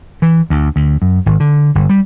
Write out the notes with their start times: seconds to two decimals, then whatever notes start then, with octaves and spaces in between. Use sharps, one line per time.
0.22 E3
0.50 D2
0.76 D2
1.02 F#2
1.26 G#1
1.40 D3
1.75 G1
1.89 G3